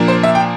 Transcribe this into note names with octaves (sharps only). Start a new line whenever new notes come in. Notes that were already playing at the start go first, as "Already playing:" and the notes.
Already playing: A#2 F3 A#3 D4
C5
E5
G5